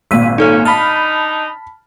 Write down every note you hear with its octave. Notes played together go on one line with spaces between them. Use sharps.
G#1 A#2 E6 B6 D#7
F#3 C#4 D#4 A4 C#5
D4 D#4 A5 B5 F6